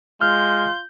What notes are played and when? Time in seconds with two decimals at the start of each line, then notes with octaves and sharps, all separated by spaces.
0.21 G#3 F4 F6 G6